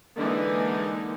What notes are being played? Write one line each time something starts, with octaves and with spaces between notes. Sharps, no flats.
D3 E3 G#3 A#3 D#4